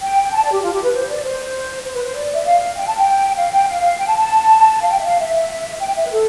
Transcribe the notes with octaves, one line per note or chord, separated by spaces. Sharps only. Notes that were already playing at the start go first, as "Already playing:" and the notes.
G5
A5
D5
G4
F4
G4
B4
C5
D5
C5
C5
B4
C5
D5
E5
F5
G5
A5
G5
F5
G5
F5
G5
A5
A5
F5
G5
E5
F5
E5
G5
E5
B4
A4